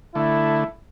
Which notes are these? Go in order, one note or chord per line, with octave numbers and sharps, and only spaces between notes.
D3 A3 E4